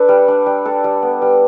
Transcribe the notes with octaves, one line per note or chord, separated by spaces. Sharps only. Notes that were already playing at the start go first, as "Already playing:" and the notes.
Already playing: D4 A4 B4
G3
D4
G3
D4 A4
G3
B3
G3